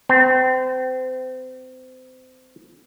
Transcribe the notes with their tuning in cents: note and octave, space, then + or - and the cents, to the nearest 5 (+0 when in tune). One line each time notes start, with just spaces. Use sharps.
C4 -30